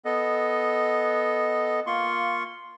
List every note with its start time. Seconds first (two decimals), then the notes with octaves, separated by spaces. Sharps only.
0.05 B3 A4 D#5
1.86 A#3 F4 C6 C#6